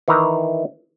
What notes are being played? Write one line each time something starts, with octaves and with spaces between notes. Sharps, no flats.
D#3 E3 E4 A#5